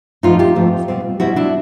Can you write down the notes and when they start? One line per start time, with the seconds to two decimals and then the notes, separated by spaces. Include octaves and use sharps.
0.23 G#2 F3 A3 C4 D#4 F4
0.39 F4 G4
0.55 G#2 F3 A3 C4
0.88 B2 G3 C4
1.20 B2 G3 C4 E4 F#4
1.36 D4 E4